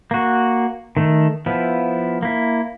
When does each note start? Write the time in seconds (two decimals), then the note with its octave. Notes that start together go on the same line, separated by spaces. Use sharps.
0.11 A#3 F#4
0.97 D#3 A3
1.46 F3 B3 E4
2.23 A#3 E4